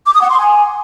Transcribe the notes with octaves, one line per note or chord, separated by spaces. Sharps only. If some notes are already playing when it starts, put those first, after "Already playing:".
D6
D#6
F#5
C6
G#5